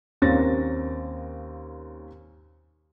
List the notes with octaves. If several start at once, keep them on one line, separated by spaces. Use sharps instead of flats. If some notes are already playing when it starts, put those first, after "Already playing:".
D#2 A#3 C4 C#4 A6 A#6